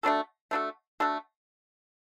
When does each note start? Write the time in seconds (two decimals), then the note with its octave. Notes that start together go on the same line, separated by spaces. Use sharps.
0.03 A3 D4 F#4 A4
0.51 A3 D4 F#4 A4
1.00 A3 D4 F#4 A4